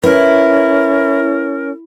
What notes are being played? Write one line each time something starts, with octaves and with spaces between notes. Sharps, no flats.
C#4 E4 A#4 B4